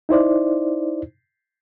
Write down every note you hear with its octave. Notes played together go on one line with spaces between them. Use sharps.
D#4 E4 C5 D5